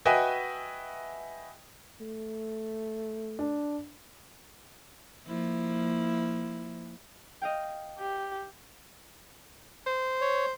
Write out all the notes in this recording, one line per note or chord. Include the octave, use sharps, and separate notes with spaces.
F#4 B4 D#5 E5 G5 G#5
A3
D4
F3 A#3 E4
D#5 F5 G5
G4
C5
C#5